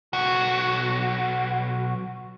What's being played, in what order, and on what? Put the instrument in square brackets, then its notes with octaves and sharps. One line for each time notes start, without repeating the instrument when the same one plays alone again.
[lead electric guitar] B1 F#4